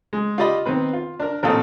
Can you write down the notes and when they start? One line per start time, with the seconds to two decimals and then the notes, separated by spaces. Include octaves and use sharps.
0.13 G#3
0.38 F4 G4 D5 D#5 B5
0.65 D#3 B3 C4 B4
0.93 F4
1.20 D4 A#4
1.43 A1 A#2 C4 A4 F5 D#6